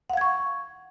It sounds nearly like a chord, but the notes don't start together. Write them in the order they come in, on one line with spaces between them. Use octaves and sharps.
F#5 F5 G#6 C#6